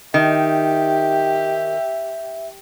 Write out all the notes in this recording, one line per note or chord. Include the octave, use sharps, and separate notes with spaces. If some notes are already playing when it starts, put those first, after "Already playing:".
D#3 G4 E5